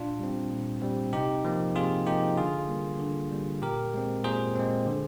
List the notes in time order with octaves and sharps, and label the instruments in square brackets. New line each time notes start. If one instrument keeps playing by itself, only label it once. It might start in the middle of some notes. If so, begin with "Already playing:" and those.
Already playing: [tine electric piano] A#2 D4 F4
G3 C4
A#2
G3 C4
C3 D#4 G4
F3 A#3
C3 F4 G#4
F3 A#3 D#4 G4
D3 F4 G#4
G3 A#3
D3
G3 A#3
A#2 G4 A#4
G#3 C4
A#2 G#4 C5
G#3 C4
D3